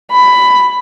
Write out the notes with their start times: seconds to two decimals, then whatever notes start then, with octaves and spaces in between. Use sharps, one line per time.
0.12 B5